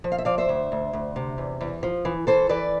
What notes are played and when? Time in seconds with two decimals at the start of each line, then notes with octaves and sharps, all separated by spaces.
0.04 F3
0.12 F5
0.18 E5
0.25 F3 D5 F5
0.38 C5 E5
0.49 D2
0.72 D2
0.93 D2
1.16 C3
1.38 E2
1.61 E2
1.83 F3
2.05 E3
2.27 E3 A4 C5
2.49 E3 B4 D5